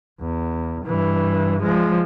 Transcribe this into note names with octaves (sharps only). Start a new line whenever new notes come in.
E2
G2 E3
F3 G#3